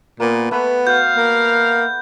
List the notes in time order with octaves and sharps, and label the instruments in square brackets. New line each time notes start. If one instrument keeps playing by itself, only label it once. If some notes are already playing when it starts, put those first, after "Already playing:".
[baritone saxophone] A#2 [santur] A#3 B3
[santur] A3 B4 [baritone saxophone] B3
[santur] F#4 F#5 [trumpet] F5 [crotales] G6
[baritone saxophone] A#3